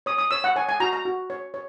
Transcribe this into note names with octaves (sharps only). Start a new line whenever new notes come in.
C#5 D#6
D#6
C#5 E6
F#5
C#5 G#5
G#5
F#4 A#5
A#5
F#4
C#5
C#5